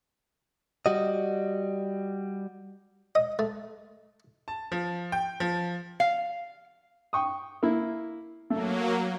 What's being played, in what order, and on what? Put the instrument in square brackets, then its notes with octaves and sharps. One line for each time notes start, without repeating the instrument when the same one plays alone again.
[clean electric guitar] G3 F#4 D#5
[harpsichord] D#5
A3
[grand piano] A5
F3
G5
F3
[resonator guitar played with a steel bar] F5
[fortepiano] G5 C#6 D#6
A#3 E4
[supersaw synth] F#3 A#3 [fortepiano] A3